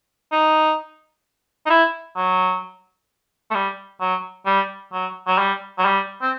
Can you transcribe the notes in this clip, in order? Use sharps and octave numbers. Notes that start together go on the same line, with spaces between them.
D#4
D#4
E4
F#3
A3
G3
F#3
G3
F#3
F#3
G3
F#3
G3
C4